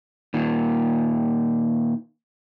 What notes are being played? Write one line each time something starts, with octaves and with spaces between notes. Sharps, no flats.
A#2 D#3